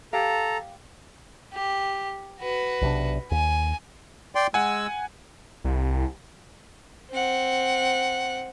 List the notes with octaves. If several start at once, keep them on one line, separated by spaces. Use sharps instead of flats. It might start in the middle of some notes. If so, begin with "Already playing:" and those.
G4 A4 F5 A#5
G4
F#4 B4
B1 C3 D4
D#2 G#5
D5 G5 C6
G#3 F#5 G#5 E6
C2
C4 F#5